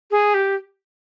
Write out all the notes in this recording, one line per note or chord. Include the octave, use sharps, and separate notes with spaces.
G#4
G4